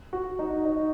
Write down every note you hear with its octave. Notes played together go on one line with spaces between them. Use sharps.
F#4
D#4
D#4